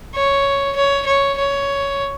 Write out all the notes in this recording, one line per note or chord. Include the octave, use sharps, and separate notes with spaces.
C#5
C#5
C#5
C#5